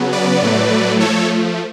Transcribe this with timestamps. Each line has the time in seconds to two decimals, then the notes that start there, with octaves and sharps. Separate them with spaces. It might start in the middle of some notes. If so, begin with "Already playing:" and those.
Already playing: C#3 F#3 B3
0.12 B4 D5
0.42 A2 F#3 A3
1.00 F3 A3 A4 C#5